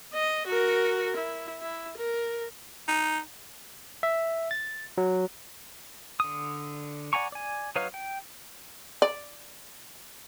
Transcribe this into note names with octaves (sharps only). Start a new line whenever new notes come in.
D#5
F#4 A#4
E4
E4
A#4
D#4
E5
A6
F#3
D3 D#6
D5 F#5 G#5 A#5 C#6
D5 G#5
F#3 D#4 B4 C#5 F5
G5
D5